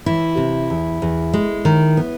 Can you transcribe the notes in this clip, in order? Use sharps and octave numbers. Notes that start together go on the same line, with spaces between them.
E3 E4
C3
E2
E2
G#3
D#3
B3